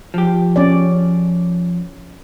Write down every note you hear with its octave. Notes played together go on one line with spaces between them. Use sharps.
F3 G4
C#4 D5